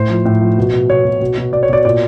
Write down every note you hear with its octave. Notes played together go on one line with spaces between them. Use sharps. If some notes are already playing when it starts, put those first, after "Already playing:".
Already playing: A2 C5
F3
A2
F3
B2
B2
B2 C#5
B2
B2
B2
B2 D5
C#5
B2 D5
A#2 D5